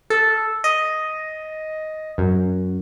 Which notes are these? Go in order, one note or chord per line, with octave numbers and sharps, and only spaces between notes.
A4
D#5
F#2